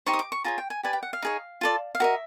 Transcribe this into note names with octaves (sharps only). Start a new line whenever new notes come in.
D#4 G4 C5 C#6
D#6
D6
C#6
F4 G#4 C#5 A#5
G5
G#5
G4 B4 D5 G#5
G5
F#5
F5
D#4 G#4 C#5
F4 A4 D5
F5
F#4 A#4 D#5 E5